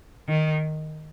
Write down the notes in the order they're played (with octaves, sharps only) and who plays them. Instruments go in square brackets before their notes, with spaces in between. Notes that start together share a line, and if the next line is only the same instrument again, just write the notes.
[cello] D#3